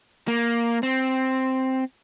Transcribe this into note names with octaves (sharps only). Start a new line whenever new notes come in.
A#3
C4